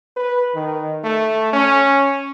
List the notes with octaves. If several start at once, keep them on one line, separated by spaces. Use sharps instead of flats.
B4
D#3
A3
C#4